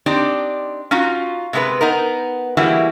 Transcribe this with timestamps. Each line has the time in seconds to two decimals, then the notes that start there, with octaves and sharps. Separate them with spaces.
0.06 C4 D4 D#4 G4 D5
0.91 C#4 D#4 F4 F#4
1.53 C3 G#3 B3 F#4 B4
1.81 B3 D#4 A#4
2.57 E3 G3 A#3 E4 F#4 G#4